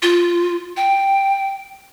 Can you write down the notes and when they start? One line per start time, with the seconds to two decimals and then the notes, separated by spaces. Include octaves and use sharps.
0.02 F4
0.77 G5